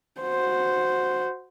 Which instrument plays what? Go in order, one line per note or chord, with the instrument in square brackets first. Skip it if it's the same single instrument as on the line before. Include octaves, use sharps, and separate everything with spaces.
[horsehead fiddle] F#4 C5